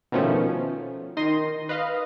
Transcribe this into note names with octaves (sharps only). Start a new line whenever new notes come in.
B2 D#3 F3 A3 C#4
D#3 C6 A#6 D#7
B4 D#5 F5